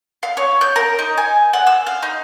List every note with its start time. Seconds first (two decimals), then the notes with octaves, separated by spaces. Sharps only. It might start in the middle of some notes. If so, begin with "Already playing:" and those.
0.23 F5
0.37 C#5
0.61 G6
0.76 A#4
0.99 D#4
1.17 G#5
1.53 F#5
1.67 E6
1.86 F5
2.03 D#4